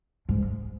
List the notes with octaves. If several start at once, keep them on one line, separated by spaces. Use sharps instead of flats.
G#2